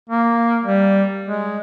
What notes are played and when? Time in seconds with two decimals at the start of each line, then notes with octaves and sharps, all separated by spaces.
0.09 A#3
0.63 G3
1.26 G#3